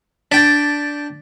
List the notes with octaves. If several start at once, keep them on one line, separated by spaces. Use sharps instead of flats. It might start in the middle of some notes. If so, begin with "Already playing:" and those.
D4 G5 A6 B6